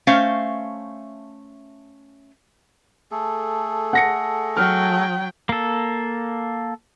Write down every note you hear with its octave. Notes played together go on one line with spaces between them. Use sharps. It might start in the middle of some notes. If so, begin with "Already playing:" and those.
A3 C#4 C5 F5
A3 G#4 A4
F#5 A#6 C#7
F#3 G5 F6
A#3 A4